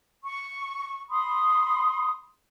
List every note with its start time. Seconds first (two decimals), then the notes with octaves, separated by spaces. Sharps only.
0.24 C#6
1.09 B5 C6 D#6